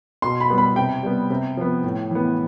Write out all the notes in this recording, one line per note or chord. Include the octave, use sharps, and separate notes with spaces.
B2 C6
B5
G3 B3
B5
C3 G5
G3 B3
C3
F3 B3
A2
E3 B3